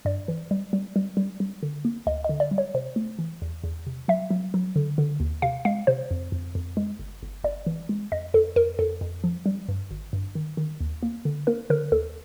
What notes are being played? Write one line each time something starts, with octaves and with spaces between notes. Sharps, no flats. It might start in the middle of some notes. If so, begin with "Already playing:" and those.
G2 D5
E3
G3
G3
G3
G3
G3
D3
A#3
D2 D#5
D#5
D3
D5
G3
C#5
C3 C5
A3
E3
E2
E2
C3
F#3 E5
F#3
F#3
D3
D3
D#2
C3 F5
G#3 F5
C3 C5
F2
F2
F2
G#3
G1
G1
G1 D5
E3
G#3
F2 D#5
F2 A4
F2 A#4
F2 A4
F2
F3
G3
G2
G#1
G2
D#3
D#3
D#2
A#3
D3
A#3 A#4
D3 A#4
D#2 A4